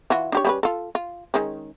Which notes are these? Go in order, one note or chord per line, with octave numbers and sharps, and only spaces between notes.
E3 F4 F#4
D4 G4 C#5
G3 C#4 B4
F4 A4
F4
D#3 G#3 C#4